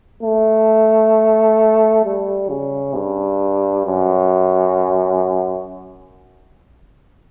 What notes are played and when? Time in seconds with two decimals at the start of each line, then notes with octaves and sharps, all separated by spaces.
0.23 A3
2.05 G3
2.49 C#3
2.95 G2
3.86 F#2